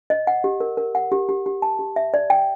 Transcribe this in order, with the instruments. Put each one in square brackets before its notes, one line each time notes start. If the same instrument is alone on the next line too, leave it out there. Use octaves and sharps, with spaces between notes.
[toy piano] D#5
F#5
G4
A#4
A#4
F#5
G4
G4
G4
A5
G4
E5
D5
G5